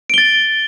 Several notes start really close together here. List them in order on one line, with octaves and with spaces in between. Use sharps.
D7 G7 A6